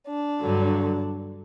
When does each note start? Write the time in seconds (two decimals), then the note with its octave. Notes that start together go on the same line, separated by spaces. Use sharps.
0.09 D4
0.41 G2 D3 F#3